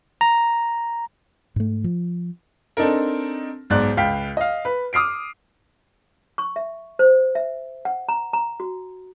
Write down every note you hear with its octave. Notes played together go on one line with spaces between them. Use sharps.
A#5
G#2 A3
F3
C4 D4 D#4 A4 A#4
B1 G#2 D5 F#6
C#2 F5 G5 B6
D#5 F5
B4
D6 D#6 F6 C7 D7
C#6
E5
C5
E5
F#5
A#5
A#5
F#4